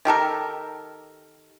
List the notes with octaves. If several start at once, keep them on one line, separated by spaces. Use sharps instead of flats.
D#3 G4 A4 A#4